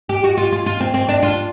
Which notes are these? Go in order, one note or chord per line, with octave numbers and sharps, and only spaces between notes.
G4
F#4
F4
F4
F4
C4
C4
D4
F4